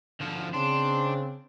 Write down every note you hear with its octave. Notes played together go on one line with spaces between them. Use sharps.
D2 F3
C#3 C4 D4 C6